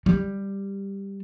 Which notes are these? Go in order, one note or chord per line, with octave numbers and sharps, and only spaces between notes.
G3